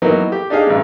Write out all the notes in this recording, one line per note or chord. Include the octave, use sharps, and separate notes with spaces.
E3 F#3 A#3 B3 D#4
G4
D4 D#4 G4 G#4 F5
A1 G2